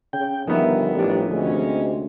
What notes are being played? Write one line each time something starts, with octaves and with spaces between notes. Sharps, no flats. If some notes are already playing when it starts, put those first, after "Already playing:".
C#3 G5
G1 D#3 F3 B3 E5
A1 G3 D4 G4
D2 C3 G#3 C#4